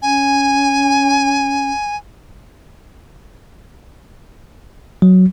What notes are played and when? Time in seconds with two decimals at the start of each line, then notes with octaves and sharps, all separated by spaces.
0.02 C#4 G#5
5.02 F#3